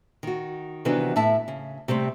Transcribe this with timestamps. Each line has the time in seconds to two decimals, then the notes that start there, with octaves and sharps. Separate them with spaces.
0.23 D#3 F#4
0.85 C3 D#3 E3 B3 D4 F#4
1.16 A2 E4 E5 A5
1.48 C#3
1.88 C3 G3 A3 C4